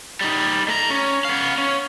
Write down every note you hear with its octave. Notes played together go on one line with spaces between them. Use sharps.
G3 D#4
A3 A#5
C#4
B3 F5
C#4